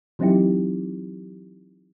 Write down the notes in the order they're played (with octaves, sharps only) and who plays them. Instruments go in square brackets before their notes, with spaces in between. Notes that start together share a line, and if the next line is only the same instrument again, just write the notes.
[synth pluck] E3 F#3 C4 D#4 E4 G4